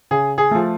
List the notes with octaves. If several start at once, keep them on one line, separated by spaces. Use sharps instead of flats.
C#3 G#4
G#4
F3 A3